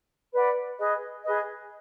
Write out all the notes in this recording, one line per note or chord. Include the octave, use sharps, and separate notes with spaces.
B4 D5 F#5
G#4 B4 D#5
G#4 B4 D#5